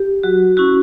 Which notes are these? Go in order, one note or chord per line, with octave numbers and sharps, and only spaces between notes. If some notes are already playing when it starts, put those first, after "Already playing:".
Already playing: G4
F#3 F#4
C#4 E4 F#4